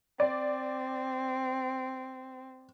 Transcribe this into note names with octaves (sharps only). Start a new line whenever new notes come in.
C4 D5